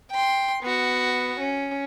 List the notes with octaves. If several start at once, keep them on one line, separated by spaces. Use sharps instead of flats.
G5 C6
B3 F#4
C#4